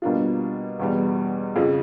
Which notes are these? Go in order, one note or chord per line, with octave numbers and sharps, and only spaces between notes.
B2 G3 A#3 D4 F4
E2 B2 G3
F2 C#3 F3